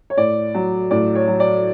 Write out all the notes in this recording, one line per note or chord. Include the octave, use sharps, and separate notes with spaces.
C#5
A2 D5
F#3
A2 D5
C#5
F#3
D5